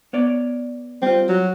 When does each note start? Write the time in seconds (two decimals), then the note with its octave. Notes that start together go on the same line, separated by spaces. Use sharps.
0.13 B3 C#5 D5
1.02 G3 C4 F4
1.29 F#3